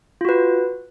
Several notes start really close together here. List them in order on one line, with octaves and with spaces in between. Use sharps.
F4 F#4 B4